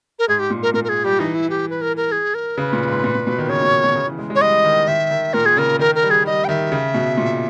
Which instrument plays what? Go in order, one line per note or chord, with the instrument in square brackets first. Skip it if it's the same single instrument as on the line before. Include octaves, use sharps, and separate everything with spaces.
[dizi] A#4
[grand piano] G#2 [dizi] G#4
[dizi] G4
[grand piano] A#2
[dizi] A#4
[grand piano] A#2 [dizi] A#4
[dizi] A#4
G#4
[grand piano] G3 [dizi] G4
[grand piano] E3 [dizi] D#4
[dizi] E4
G4
B4
A#4
A#4
G#4
A#4
[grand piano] C#3 [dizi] B4
[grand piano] A#2
G#2
A#2
A#2
B2
D#3
[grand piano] C#3 [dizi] C#5
[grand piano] B2
B2
C#3
E3
G#3
G#3
[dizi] C#5
[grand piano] G3 [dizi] D#5
[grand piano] D#3
[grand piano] D#3 [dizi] E5
[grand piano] D#3
[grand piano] A#2 [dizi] A#4
[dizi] G#4
[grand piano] C#3 [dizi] A#4
[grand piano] D#3 [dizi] A#4
[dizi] A#4
[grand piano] G3
[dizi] G#4
[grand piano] G3 [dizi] D#5
[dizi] G5
[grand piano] D#3 [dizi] E5
[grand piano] C#3
B2
A#2